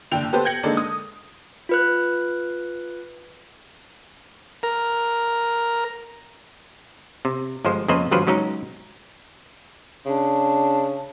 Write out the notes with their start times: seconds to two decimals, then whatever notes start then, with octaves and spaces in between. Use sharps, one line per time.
0.12 F#1 D3 G5 F7
0.33 B3 G4 A4 B4 C5
0.45 G5 G6 G#6 A#6 C#7 F#7
0.63 D3 G#3 A#3 D4 D#4 A4
0.77 D#6
1.69 F4 B4 F#6
4.63 A#4
7.25 C3
7.64 G1 F3 G#3 C5
7.88 F2 C#3 A#3 B4 C5 D#5
8.11 G#1 G2 F3 F#3 B4 C5
8.27 C#3 F#3 G#3 C#4 D#4
10.06 C#3 D4